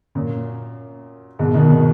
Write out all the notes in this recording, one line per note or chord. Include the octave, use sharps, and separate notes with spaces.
F#2 A#2
G#2 B2
B2 D#3
B2 D#3